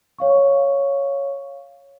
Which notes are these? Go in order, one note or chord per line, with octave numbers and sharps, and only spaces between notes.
C#5 F5 C#6